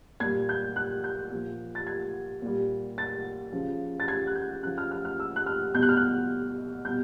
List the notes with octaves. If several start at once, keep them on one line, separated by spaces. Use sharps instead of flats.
A#2 G3 G#6
G6
F#6
G6
A#2 F3
A6
G#6
A#2 G3
A6
C#3 F3
A6
G#6
F#6
G6
C#3 F3 F#6
F6
F6
F6
E6
F#6
F6
B2 G3 G6
F#6
F6
F#6
B2 G3 G6